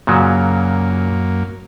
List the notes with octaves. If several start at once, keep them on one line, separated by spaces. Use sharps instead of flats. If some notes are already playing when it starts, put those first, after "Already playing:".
F#2 A#2 C#3 F#3 A#3